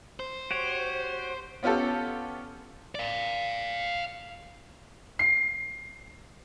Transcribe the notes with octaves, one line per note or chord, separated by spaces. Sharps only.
C5
F#4 G4 C#5
B3 C#4 F4 G4 A4
D5 F5
C7